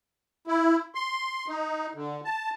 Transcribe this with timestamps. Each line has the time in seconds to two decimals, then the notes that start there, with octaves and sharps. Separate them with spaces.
0.47 E4
0.95 C6
1.48 D#4
1.95 D3
2.25 A5